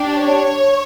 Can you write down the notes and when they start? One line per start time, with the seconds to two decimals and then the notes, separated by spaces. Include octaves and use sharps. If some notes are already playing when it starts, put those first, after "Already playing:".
Already playing: D4 G4
0.17 C#5